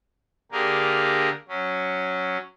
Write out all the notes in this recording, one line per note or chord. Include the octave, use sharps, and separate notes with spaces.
D3 A#3 G4 G#4 A#4
F#3 C#4